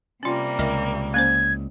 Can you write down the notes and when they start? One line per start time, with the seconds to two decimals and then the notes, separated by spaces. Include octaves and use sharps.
0.23 C3 G3 A#3 C#4 F4
0.59 C#2 A#4 D#5 E5
1.14 A#3 C#4 C5 G#6